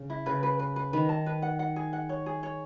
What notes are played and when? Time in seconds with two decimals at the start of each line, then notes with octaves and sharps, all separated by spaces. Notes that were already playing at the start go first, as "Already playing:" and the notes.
Already playing: C#3
0.10 E4
0.26 C#3 B4
0.43 B4
0.59 B4
0.76 B4
0.93 D#3 B4
1.09 A5
1.26 B4
1.42 F#5
1.59 F#5
1.76 G#4
1.93 F#5
2.09 C#5
2.26 G#4
2.43 C#5